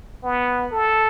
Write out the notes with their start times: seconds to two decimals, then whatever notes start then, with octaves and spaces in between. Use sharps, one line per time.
0.24 B3
0.72 A4